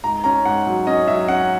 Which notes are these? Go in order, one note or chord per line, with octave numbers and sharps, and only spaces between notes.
G#2 A#5
C#4 A#5
G#2 F#5
F#3
C#4 D#5
F#3 E5
C#4 F#5